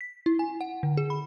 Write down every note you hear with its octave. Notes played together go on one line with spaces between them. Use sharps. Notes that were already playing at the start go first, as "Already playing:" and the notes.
B6
E4
G#5
F#5
D3
G#4
B5